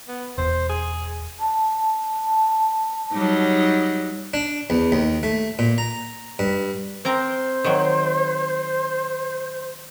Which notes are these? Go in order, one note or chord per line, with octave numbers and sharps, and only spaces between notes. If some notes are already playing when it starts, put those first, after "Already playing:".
B3
E1 C5
G#4
A5
F#3 G3 D#4
D4
E2
D#2
A3
A#2
A#5
G2
C4 A#4 C5 A#5
D#3 F#3